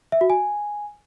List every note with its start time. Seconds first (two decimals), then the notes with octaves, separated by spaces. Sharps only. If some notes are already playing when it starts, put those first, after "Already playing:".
0.12 E5
0.21 F#4
0.30 G#5